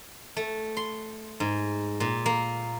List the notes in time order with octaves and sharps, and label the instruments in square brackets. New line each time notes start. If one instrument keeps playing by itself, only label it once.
[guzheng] A3
C6
G#2
A#2
A#3